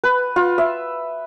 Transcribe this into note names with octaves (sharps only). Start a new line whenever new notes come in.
B4
F4
E5